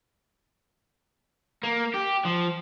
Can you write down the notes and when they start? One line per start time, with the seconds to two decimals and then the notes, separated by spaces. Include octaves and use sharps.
1.64 A#3
1.94 G4
2.25 F3